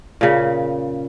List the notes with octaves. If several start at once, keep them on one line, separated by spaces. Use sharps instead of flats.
A#2 C#3